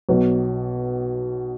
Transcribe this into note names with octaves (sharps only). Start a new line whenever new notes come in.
B1 B2 F#3